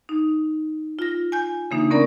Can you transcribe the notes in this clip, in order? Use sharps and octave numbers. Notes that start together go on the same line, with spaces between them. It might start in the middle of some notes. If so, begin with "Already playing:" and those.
D#4
F4 A#6
G#5 G6
C#3 E3 A#3 D4 D#4
B3 C#4 A#4 D5 A#5